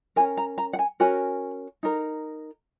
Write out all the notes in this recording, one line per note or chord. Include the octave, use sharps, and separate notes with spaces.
C#4 F#4 A#4 G#5
A#5
A#5
F#5
G#5
C#4 F#4 A#4 G#5
D#4 A#4